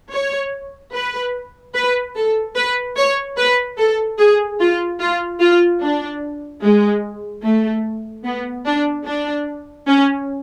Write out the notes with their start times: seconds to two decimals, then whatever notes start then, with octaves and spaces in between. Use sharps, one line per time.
0.12 C#5
0.93 B4
1.74 B4
2.15 A4
2.55 B4
2.97 C#5
3.37 B4
3.78 A4
4.18 G#4
4.59 F4
5.00 F4
5.40 F4
5.81 D4
6.62 G#3
7.44 A3
8.25 B3
8.65 D4
9.06 D4
9.88 C#4